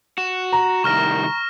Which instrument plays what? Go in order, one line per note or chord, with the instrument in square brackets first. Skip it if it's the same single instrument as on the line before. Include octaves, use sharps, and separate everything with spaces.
[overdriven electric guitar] F#4 [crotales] E7
[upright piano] A#5
[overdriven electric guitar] C2 D#3 [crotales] C#6 F6 A#6